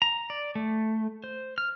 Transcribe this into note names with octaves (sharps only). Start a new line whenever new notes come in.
A#5
D5
A3
C5
F6